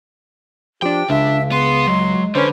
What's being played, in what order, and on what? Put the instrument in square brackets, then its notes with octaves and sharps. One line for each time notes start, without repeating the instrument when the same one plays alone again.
[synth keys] F3 D4 [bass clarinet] G4 [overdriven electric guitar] G5
[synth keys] C#2 [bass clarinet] C#3 [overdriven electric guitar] D4 [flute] E5
[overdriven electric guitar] B3 [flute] C6
[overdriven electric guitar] F#3 [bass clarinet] G#3
[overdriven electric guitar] D3 [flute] C#4 [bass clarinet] B4 [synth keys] C5